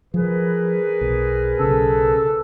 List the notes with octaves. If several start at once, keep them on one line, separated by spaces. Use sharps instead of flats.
F3 G#4 A#4 B4
B1
B1 C#3 A4